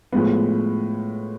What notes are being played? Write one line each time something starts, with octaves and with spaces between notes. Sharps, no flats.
A2 F3 G#3 B3